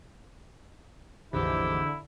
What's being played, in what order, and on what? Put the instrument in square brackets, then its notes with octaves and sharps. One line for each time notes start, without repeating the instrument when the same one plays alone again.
[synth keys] A#1 F2 E3 [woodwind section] G#2 G4 [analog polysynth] D3 [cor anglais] E4